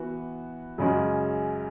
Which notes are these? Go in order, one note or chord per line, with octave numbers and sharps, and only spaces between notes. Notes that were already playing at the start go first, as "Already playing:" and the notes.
Already playing: E3 B3 F#4
F#2 C#3 G#3 C#4 F#4